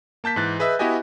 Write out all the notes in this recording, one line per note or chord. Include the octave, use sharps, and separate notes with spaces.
A#3 A5 G6 B6
G#2 E3 F#6 A6
G#4 B4 D#5 E5
B3 E4 F#4 G4 D#5 G#5